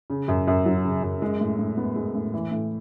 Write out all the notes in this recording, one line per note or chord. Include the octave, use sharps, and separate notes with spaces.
C#3
F#2
F#2
F#3
C#3
F#2
G#3
A2
A2
B3
G#3
A2
E3
A2